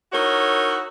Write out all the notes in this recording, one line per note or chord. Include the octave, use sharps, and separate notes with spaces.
D#4 E4 F#4 A#4 C#5